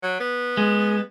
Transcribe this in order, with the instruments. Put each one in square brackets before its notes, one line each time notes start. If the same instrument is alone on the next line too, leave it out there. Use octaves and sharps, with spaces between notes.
[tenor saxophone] F#3
B3
[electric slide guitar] G#3